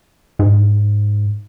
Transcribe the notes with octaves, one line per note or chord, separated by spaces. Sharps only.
G#2